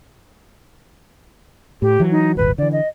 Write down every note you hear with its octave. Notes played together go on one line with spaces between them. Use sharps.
A2 G4
E3 F#3
D#4
D#1 G#1 B4
D3 E3 D5
D#5